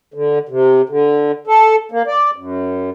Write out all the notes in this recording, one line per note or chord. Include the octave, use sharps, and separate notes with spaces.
D3
C3
D3
A4
A#3
D5
F#2